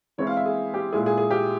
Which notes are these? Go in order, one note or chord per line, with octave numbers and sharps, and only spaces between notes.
E3 G#3 C4 E4 C#5
F5
E5
G#4
G4
A#2 G#3 E4 G#4
G#4
G#4
G4